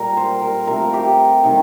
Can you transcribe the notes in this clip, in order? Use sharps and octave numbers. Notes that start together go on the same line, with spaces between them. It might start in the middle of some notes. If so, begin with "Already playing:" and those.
Already playing: A#2 G3 A#4
C5
A#4
C3 F3 A3 A#4
G4
C3 D#3 G3 D#4